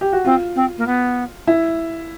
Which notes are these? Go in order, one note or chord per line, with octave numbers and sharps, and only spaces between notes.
G4
F#4
C4 F4
C4
A#3
B3
E4